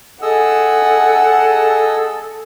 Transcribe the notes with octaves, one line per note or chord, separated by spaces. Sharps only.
G#4 A4 D#5 F#5 E6